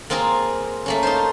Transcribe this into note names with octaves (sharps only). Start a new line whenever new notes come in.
A#3 C4 F4 G#4 A#4
A3 A#3 C#4
D#4 F4 C5